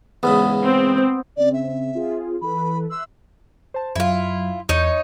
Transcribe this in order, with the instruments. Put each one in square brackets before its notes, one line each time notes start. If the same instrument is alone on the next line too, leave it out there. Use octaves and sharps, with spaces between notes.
[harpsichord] E2 G#2 C#3 [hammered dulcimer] B3
[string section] C4
[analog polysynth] C#3 C4 [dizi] D5
[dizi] E5
[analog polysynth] C4 F4 G#4
[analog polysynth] E3 A4 B4 [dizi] B5
[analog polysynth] E5 C6 F#6 [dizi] E6
[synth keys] C5 A5
[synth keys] F#2 F#3 [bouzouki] E4 F4
[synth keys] E2 G6 [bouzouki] D#4 C#5